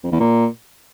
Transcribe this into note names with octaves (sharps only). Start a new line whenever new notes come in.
F2
E2
A#2